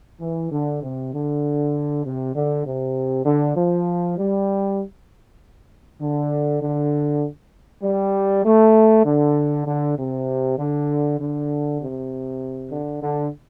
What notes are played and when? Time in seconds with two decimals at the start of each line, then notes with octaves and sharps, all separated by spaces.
0.21 E3
0.52 D3
0.83 C3
1.13 D3
2.05 C3
2.35 D3
2.66 C3
3.26 D3
3.56 F3
4.18 G3
6.01 D3
6.62 D3
7.83 G3
8.45 A3
9.05 D3
9.67 D3
9.98 C3
10.58 D3
11.19 D3
11.80 C3
12.71 D3
13.02 D3